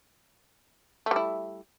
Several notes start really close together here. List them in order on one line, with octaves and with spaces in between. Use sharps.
A3 G3 E4